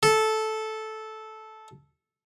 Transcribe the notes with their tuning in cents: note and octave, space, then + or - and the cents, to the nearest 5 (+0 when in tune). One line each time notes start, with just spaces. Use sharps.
A4 -10